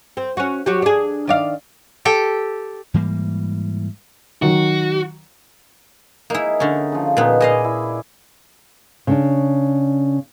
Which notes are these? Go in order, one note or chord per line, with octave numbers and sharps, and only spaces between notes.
C4
C#4 F#4
F#3 F#4 G4
D4 G#4
D#3 D5 F5
G4 A4 G5
G#2 E3 G3 A#3
D#3 F#3 F#4
A#3 D#4 E4 G#4
D3 C#4
C#3 F3
A#2 B3 D#4 C6
A#2 G#4 B4 D5 D#5 F5
E4
C#3 C#4 D4